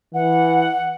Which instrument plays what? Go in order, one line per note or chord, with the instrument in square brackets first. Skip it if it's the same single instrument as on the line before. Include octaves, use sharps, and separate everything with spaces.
[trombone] E3 [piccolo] F#5